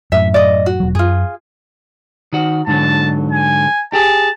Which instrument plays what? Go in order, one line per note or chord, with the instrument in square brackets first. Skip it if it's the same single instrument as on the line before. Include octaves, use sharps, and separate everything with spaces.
[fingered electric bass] F#2 A2 [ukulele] E5
[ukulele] D5 D#5
F#4
[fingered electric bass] E1 F#3
[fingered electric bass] F#2 [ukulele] F4 G#4
[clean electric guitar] D#3 F#4
[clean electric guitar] G#2 D3 F#3 [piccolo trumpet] A5
[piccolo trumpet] G#5
[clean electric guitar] G4 G#4 [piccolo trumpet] A5